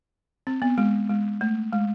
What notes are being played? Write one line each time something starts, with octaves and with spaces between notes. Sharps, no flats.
C4
B3
G#3
G#3
A3
G#3